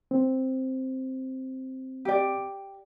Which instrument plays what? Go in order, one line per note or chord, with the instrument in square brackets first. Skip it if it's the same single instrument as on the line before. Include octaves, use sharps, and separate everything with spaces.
[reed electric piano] C4
[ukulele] G4 D5